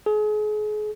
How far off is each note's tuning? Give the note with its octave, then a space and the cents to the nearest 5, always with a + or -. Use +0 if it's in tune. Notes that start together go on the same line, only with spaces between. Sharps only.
G#4 +35